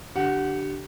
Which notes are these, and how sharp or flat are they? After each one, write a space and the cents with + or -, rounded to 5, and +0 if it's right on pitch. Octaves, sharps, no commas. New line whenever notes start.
D3 +5 G4 -30 F#5 +0